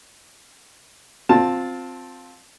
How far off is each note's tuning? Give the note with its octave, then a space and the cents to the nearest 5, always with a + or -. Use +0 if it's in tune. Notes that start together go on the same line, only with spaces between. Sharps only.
C4 +0 F4 +20 A5 +0